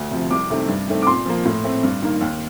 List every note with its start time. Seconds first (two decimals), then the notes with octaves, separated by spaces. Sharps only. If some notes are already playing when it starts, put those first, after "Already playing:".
Already playing: D2
0.11 C3 F3
0.31 C2 D6
0.50 C3 D#3 A3 C4
0.68 G2
0.88 D#3 A3 C4
1.02 D6
1.07 A#2 C6
1.26 F3 A#3
1.45 A2
1.64 A3 C4
1.83 G2
2.02 D#3 A#3
2.21 D#2